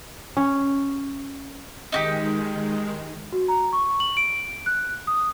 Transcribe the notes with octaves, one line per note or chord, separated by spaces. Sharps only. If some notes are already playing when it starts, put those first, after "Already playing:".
C#4
D#3 G#3 D#4 F#4 G4
F#4
A#5
C#6
F#7
D7
F#6
D#6